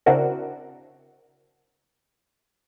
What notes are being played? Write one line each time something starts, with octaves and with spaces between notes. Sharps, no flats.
C#3 C4 D4 E4 F#4 A#4